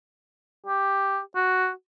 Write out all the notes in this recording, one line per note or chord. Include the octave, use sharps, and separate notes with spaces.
G4
F#4